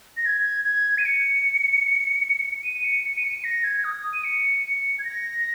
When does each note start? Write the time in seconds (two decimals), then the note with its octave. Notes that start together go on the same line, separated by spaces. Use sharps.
0.17 A#6
0.26 G#6
0.65 G#6
0.98 D#7
1.06 C#7
2.64 D#7
2.84 C#7
3.05 C#7
3.18 D#7
3.24 C#7
3.44 A#6
3.64 G#6
3.84 D#6
4.14 D#7
4.24 C#7
4.99 G#6
5.04 A#6